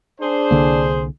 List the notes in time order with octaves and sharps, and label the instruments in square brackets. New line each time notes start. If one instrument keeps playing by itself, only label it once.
[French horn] D4 [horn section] G#4 C5
[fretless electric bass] C2 D3 A#3